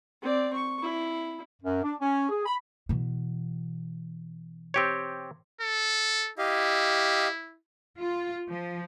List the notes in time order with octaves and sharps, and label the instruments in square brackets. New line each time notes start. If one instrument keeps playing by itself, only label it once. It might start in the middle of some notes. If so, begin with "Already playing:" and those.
[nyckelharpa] C4 D5
C#6
E4
[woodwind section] F#2
D4
C#4
G#4
B5
[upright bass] B2 E3
[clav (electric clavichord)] C4 G4 C#5
[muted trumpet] A4
[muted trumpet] E4 [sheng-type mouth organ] G4 D#5 F5
[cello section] F4
F3